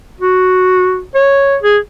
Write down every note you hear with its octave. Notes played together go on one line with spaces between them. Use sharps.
F#4
C#5
G#4